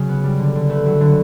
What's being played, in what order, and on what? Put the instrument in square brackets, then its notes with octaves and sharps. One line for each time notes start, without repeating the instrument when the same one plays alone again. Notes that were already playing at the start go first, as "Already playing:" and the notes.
Already playing: [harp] C#3 F#3
B3
G3
D3
D3
A3 B4
F#3
D3